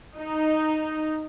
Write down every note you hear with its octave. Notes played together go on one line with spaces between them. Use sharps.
D#4